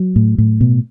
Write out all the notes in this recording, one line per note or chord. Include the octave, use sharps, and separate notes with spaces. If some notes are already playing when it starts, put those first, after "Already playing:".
Already playing: F#3
A2
A2
B2